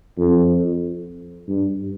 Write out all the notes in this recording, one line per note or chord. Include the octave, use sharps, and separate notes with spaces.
F2
G2